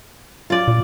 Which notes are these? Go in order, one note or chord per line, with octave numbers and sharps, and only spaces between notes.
F4 D5
A#2